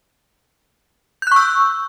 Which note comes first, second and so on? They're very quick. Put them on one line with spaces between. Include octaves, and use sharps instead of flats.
G6 F#6 C#6 E6